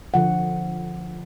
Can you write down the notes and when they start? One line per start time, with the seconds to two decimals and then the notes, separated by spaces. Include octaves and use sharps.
0.14 D3 F3 F#5